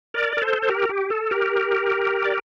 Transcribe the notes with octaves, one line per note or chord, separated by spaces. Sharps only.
A#4 D5
A#4
A4 C5
C5
G4 A#4
G4
A4
G4 A#4
D5